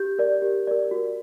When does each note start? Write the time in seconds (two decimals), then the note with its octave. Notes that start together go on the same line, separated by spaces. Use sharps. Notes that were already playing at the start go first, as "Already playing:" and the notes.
Already playing: G4 G6
0.19 A#4 D5
0.42 G4
0.67 A#4 D5
0.91 F#4